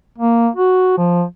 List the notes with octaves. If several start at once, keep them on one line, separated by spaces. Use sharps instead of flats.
A#3
F#4
F3